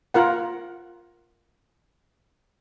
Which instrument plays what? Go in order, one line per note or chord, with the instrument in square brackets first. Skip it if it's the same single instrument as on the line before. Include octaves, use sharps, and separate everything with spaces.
[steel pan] F4 A#4 F#5